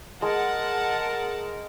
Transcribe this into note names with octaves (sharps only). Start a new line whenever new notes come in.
G#3 A#4 F#5 A5